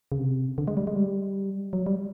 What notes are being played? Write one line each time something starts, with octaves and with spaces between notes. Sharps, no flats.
C#3
C3
D3
G#3
G3
G#3
G3
F#3
G3